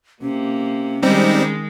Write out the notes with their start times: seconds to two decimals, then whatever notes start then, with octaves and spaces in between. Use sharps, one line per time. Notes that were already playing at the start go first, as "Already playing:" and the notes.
0.22 C3 A#3 C#4
1.03 D#3 G3 G#3 C4 D#4